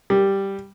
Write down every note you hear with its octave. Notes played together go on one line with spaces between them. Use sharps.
G3